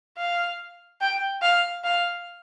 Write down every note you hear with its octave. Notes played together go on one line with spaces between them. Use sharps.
F5
G5
F5
F5